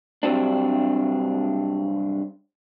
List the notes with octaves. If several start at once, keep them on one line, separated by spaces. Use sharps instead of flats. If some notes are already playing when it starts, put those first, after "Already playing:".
G2 C3 F3 F#3 C4 D4